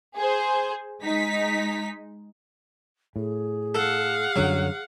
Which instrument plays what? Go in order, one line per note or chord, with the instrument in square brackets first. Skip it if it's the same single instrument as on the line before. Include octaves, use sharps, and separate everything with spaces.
[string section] G#4 C5
G#3 D#4 B6
[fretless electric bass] A2 [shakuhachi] G#4
[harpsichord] A4 [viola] F5 F#5
[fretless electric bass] F#2 D3 G3 [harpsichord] F#3